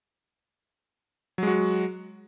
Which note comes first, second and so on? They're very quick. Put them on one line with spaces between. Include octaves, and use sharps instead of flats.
F#3 G#3 F#4